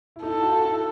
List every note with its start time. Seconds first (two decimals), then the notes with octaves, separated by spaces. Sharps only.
0.16 E4
0.23 D#4 A4
0.31 E4
0.42 F#4
0.51 F4
0.66 E4